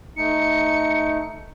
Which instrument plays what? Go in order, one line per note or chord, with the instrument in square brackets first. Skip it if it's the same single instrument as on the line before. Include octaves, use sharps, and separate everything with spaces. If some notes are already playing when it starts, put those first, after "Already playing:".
[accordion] A3 D#4 [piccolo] C#7